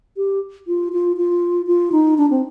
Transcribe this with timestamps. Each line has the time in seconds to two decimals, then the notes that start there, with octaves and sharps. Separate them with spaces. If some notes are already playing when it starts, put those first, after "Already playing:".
0.17 G4
0.67 F4
0.93 F4
1.17 F4
1.67 F4
1.92 D#4
2.18 D4
2.30 C4